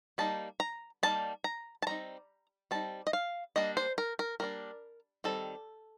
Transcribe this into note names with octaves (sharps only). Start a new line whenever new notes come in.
G3 A#3 D#4 A5
A#5
G3 A#3 D#4 A5
A#5
A5
G3 C4 D#4 A#5
G3 C4 D#4 A5
D#5
F5
G3 A#3 D4 D#5
C5
A#4
A#4
G3 A#3 D4 A#4
D#3 G3 C4 A4